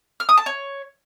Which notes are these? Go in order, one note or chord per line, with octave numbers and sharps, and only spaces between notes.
F6
D#6
A5
C#5